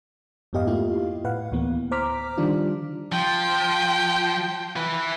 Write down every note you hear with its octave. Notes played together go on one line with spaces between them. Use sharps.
F2 G#2 B3 G4 D#5 F5
A3 A#3 E4 F4 G4 F5
A2 B4 F5 F#5
D2 A2 E3 A#3 B3
C5 A#5 D6 F6 B6
D3 D#3 F3 G3 D4 F4
F3 G5
E3 B4